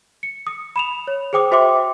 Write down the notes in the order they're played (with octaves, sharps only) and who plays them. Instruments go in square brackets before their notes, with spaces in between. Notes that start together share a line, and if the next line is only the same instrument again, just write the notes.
[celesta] C#7
D#6
B5 E7 F7
C#5
G#4 C5 G5 D6 D#6
F#4 C5 E5 G5 C6 D6